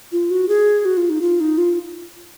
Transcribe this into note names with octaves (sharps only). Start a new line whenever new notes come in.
F4
F#4
G#4
F#4
F4
D#4
F4
D#4
F4